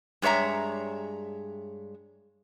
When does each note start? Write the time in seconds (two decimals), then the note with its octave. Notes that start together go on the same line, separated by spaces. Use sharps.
0.22 G2 G#3 C#5 E5 A#5